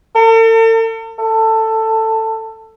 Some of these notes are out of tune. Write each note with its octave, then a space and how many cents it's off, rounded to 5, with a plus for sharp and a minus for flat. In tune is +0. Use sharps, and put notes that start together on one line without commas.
A4 +45
A4 +15